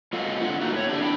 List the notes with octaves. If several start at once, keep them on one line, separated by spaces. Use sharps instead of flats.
G#3 F4 F#4 A4 F5
D3 F4 F#5
A3 A#3 D#4 F#4
A2 C#5
D4 G4 A4 D5
D4 E4 F#5 G5